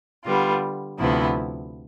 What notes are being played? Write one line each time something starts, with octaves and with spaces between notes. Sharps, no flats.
D3 G3 B3 F4
D2 C3 F3 B3 E4